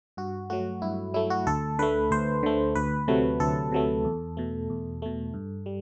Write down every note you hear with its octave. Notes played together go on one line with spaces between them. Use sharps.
G2 F#4
F#3 A3 F#4
G2 E4
F#3 A3 E4
F#4
D2 A4
D3 A3 B4
D2 C5
D3 A3
D2 B4
C3 F#3 A3
D2 A4
C3 F#3 A3
E2
B2 A3
E2
B2 A3
G2
G3